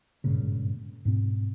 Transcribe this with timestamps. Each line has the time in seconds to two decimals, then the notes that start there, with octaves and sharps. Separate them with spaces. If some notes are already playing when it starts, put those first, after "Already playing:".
0.24 G#1 G2 A#2 C#3
1.05 G#2 B2 C4